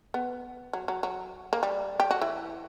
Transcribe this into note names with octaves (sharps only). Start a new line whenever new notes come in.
B3
F#3
F#3
F#3
A#3
G3
G4
F#4
E3 E4